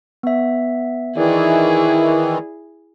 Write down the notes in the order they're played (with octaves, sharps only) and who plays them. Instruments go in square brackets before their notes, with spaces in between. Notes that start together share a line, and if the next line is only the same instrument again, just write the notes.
[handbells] B3 E5
[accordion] D#3 E3 [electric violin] E4 G#4 [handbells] D5